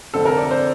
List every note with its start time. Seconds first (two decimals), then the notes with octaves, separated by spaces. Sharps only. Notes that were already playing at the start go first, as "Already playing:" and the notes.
0.13 F1 F2 D3 A3 C4 A4
0.25 A#4
0.38 D5
0.51 C5